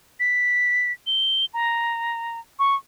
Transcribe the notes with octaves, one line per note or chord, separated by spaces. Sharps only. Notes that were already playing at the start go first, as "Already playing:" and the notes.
B6
G7
A#5
C#6